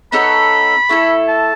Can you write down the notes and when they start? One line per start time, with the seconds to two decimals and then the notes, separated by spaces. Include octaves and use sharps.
0.12 B3 D#4 A4 C#5 B5
0.89 A3 E4 A4
1.28 A5